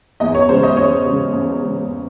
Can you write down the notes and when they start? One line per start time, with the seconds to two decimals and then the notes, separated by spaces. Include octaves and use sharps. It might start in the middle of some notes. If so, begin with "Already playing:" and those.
0.20 E2 D#5
0.34 C#5
0.49 C#3 G#3 C5
0.63 D#5
0.77 E2 C#5
1.05 C#3 G#3
1.33 E2
1.61 C#3 G#3